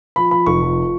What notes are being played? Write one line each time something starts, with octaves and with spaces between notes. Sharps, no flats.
F3 B5
F3 B5
F1 C#6
F3